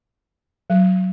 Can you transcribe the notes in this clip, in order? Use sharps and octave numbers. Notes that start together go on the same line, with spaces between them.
F#3